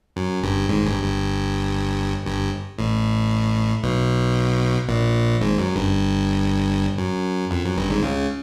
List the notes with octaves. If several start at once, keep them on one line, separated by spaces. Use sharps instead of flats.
F#2
G1 G2
G#1 G#2
G1 G2
G1 G2
G1 G2
A1 A2
B1 B2
A#1 A#2
G#1 G#2
F#2
G1 G2
F#2
F2
F#2
G1 G2
G#1 G#2
C#2 C#3